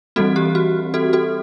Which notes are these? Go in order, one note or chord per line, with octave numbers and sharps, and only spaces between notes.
E3 G3 C4 F#4 A4
G4
F#4
F#4 A4
F#4 A4